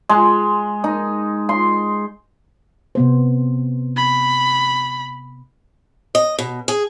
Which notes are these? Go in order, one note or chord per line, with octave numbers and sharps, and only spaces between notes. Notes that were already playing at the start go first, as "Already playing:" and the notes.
G#3
D#4
C6
C3 B3 C5
B5
D#5
B2
G#4